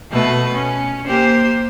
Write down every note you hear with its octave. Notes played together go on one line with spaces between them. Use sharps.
B2 A3 B4
C#4
A#3 G4 C5